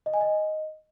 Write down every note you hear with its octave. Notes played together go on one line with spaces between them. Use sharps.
D#5
G#5
D#5